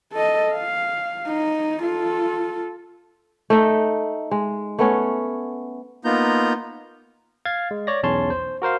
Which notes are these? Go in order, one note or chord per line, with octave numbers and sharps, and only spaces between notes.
A4 D#5
F5
D#4
F4 A4
A3 D#4 E5
G#3
A3 B3 C#4
A#3 B3 D#4 F4 A#5 G6
F5 G#6 A6
G#3
C#5 D5 A#6
B1 E2 C#4 C#5 A5 C6
C5
F#4 A#4 C5 F5